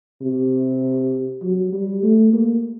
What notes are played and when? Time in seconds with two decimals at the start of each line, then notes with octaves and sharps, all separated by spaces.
0.22 C3
1.43 F#3
1.73 G3
2.03 A3
2.33 A#3